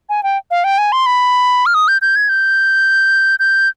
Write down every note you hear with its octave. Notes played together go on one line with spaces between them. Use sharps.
G#5
G5
F5
G5
G#5
C6
B5
F6
D#6
G6
G6
G#6
G6
G6